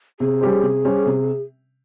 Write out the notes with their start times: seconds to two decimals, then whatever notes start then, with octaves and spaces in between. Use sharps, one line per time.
0.20 C3 G#4
0.41 G3 C#4 G4 C5
0.63 C3
0.85 G3 C#4 G4 C5
1.06 C3